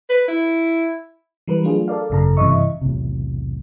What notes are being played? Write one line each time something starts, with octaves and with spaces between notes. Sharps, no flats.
B4
E4
E3 G3 A#4 B4
F#3 A3 D4 F4 G#4
A4 A#4 D5 F5
G#1 F#2 C#3 A4 A#5
G2 C3 E3 D#5 E5 C#6
B1 E2 A2 C3